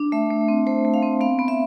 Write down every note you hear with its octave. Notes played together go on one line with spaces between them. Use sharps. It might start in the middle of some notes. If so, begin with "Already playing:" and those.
Already playing: D4
A3 E5
A3
C4
A3 C5
A3
F5
C4
B3 F5
B3
E5